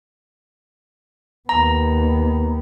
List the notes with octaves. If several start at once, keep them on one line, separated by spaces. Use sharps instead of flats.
D#2 B3 A#5